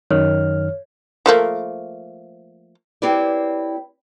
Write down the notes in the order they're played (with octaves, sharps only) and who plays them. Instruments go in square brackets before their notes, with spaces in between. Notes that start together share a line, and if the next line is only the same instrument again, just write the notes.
[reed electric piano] F#2 D#3 F6 [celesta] C#5
[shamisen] F3 A3 A#3
[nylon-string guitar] C4 E4 G4 B4 C#5 D5